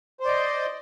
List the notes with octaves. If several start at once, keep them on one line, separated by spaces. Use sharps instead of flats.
C5 D5 D#5 C6